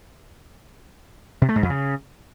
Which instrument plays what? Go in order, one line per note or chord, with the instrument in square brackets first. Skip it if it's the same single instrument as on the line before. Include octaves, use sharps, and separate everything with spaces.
[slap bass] C3
A3
G#2
F2
C#3